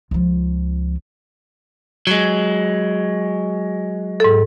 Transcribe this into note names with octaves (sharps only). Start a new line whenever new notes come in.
C#2 F3
F#3 G#3
G#2 A4